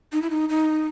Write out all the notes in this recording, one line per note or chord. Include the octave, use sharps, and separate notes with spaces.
D#4
E4
D#4
D#4